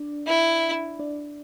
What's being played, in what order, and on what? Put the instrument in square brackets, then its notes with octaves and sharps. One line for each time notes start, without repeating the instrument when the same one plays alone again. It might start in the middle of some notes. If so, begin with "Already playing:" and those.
Already playing: [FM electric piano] D4 D5
[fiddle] E4
[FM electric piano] D4 D5